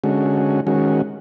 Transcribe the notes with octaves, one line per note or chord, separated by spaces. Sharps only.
D3 G#3 C#4 F#4
D#3 G#3 C#4 F#4